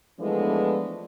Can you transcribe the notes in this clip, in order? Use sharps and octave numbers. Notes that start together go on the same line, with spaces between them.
E3 F3 G#3 A3 B3 D4